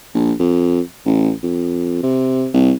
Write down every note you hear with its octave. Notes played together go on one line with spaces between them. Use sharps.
A#1
F2
A1
F2
C3
C2